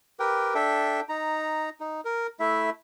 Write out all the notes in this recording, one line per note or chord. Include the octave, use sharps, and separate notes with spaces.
G4 A#4 B4 G5
D4 A4 E5 G5
D#4 A#5
D#4
A#4
A3 E4 E5